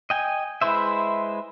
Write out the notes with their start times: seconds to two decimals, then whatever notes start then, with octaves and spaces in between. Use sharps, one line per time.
0.10 D#5 G5 G#5
0.62 G#3 E4 B4 C5 E5